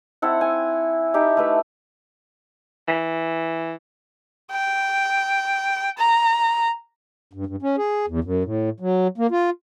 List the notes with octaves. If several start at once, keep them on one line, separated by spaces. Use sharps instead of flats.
C4 E4 A4 F#5
G#5
D#4 E4 G4 A4
A3 B4 E5
E3
G5
A#5
G2
G2
C#4
G#4
E2
F#2
A2
F#3
A#3
F4